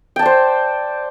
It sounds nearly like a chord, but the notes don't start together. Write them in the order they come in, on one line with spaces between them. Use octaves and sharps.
G5 A5 D5 C5